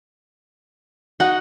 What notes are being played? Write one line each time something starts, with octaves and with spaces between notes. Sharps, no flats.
D#4 F#4 D#5 F#5